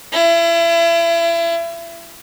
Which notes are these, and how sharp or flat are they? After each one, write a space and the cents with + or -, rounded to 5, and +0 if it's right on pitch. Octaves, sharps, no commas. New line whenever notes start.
E4 +35